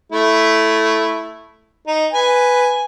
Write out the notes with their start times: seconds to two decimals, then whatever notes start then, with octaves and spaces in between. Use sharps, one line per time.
0.12 A3 E4
1.87 D#4
2.13 B4 G#5